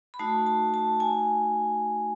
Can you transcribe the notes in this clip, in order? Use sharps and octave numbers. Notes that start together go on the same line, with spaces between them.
B5
A3 D#4 F#4 A5
A5
A5
G#5